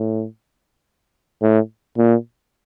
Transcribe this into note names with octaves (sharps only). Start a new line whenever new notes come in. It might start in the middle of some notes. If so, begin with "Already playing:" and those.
Already playing: A2
A2
A#2